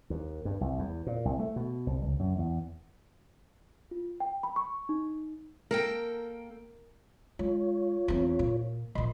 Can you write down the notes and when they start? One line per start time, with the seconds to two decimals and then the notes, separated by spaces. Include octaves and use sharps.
0.10 D#2
0.45 G2
0.61 C2
0.79 E2
1.07 A#2
1.25 C2
1.39 A3
1.56 B2
1.87 C2
2.04 C#2
2.19 F#2
2.39 E2
3.91 F4
4.20 G5
4.43 B5
4.56 C#6
4.89 D#4
5.71 A#3 A4 A#4 G5
7.39 G#3 F4 C#5
8.08 E2 C4
8.39 A#2
8.95 A#1 A#2 D#5 B5 C6